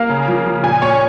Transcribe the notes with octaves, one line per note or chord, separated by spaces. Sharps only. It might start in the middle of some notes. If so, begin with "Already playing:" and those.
Already playing: A#3 F5
C#3
F3
F3
A#2 G#5
A#2 C#5